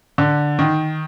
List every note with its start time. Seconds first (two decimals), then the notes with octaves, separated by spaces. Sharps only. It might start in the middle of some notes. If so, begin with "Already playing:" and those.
0.18 D3
0.59 D#3